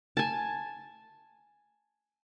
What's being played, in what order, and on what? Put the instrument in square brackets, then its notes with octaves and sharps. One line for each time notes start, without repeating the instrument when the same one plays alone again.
[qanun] G#5 A5